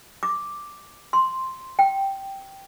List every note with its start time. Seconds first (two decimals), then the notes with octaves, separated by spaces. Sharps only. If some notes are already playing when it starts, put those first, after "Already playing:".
0.23 D6
1.13 C6
1.79 G5